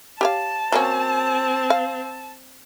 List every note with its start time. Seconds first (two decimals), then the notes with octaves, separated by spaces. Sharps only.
0.21 G4 C#5 F5 A5
0.72 F#3 A#3 C4 C#4
1.70 F5